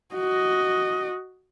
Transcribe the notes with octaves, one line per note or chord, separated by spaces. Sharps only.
F#4 D#5